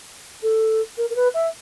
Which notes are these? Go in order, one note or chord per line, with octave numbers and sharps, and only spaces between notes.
A4
A#4
A#4
B4
E5